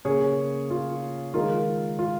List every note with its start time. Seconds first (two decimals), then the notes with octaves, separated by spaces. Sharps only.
0.05 C#3 A#3 G#4 C#5
0.70 F4
1.34 D#3 G#3 F4 A#4
1.99 F4